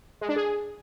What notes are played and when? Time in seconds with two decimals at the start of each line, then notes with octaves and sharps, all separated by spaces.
0.21 G#3
0.29 D4
0.36 G#4